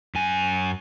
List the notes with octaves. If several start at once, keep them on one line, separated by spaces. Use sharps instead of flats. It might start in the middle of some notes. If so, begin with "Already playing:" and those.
F#2 G#5